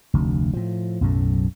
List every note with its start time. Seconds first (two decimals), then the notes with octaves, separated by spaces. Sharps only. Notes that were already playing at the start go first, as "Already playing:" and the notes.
0.14 F1 D2
0.53 A2 F3
1.01 B1 F#2 A2